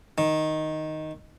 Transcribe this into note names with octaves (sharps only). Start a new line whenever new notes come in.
D#3